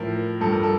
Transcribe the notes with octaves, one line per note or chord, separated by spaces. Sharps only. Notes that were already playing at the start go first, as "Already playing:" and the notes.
Already playing: A2 F3 A#4
G2 F3 A4
A#4
A4